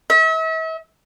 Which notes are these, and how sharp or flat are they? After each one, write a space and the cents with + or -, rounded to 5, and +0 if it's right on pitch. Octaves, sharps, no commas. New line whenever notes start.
E5 -40